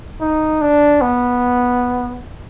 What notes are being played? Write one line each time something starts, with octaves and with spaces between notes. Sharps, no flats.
D#4
D4
B3